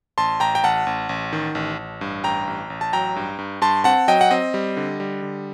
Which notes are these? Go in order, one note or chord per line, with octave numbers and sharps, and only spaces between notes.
A1 A5 C6
A1 G5 A#5
G5
A1 F#5 A5
A1
A1
D#3
A1
A1
G2
A1 G5 A#5
A1
A1
A5
F#3 G5 A#5
G2
G2
G2 A5 C6
C4 F#5 A5
F#3 D#5 G5
F#5
C4 D#5
G3
D3
G3
D3